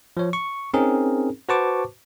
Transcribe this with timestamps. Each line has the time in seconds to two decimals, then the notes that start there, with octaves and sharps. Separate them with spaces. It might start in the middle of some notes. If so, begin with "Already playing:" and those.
0.17 F3 C#5
0.33 C#6
0.74 C4 C#4 D#4 G#4 A#4
1.49 F#4 B4 C5 A5 C#6 D6